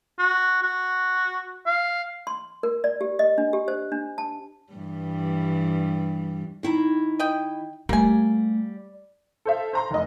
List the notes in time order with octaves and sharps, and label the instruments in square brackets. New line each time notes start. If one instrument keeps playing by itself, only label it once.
[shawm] F#4
F#4
F5
[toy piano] C6
A#4
D5
G4
D#5
D4
G4
C5
D4
A5
[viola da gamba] G2 E3 G3
[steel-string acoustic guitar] D#3 E4 A#5
[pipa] D#5 G5
[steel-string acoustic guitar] G3 [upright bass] A3 [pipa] A#3 G#5
[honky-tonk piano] A4 C5 E5 F5
C5 A#5 C6
F1 D#5